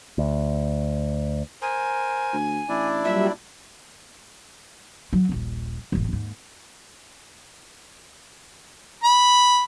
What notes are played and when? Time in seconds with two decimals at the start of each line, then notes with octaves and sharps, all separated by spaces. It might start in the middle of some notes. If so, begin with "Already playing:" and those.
0.18 D2
1.62 A#4 C5 G#5
2.33 D2
2.69 A1 D4 E4 D5
3.05 A#2 F#3 G3 E5
5.13 F#3
5.29 D#1 A#1
5.92 E1 A1
6.09 D#2 G#2
9.04 B5